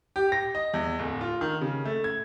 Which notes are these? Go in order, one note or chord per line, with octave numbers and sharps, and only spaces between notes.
G4
A#6
D#5
E2
D1
F4
D#3
C#3
A3
G#6